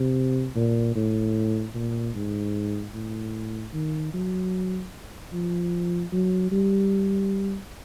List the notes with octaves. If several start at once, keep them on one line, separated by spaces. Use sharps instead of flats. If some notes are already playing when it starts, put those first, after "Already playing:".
Already playing: C3
A#2
A2
A#2
G#2
A2
D#3
F#3
F3
F#3
G3